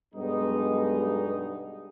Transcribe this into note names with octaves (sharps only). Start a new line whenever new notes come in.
B1 G2 B2 G3 G#3 D#4